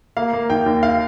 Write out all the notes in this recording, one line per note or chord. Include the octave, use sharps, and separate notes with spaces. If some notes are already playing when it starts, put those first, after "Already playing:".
A#3 F5
A#3
D#3 G5
D#2
F5